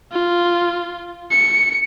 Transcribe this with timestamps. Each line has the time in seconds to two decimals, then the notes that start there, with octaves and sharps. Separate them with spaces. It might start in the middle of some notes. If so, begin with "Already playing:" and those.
0.12 F4
1.31 C#7